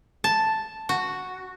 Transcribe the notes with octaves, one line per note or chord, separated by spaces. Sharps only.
A5
F#4